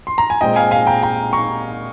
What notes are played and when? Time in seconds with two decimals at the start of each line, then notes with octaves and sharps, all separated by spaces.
0.07 C6
0.18 A#5
0.30 G#5
0.41 A#2 G#3 C4 D#5 G5
0.56 F5 G#5
0.71 F5 G#5
0.87 G5 A#5
1.03 G5 A#5
1.33 A#5 C#6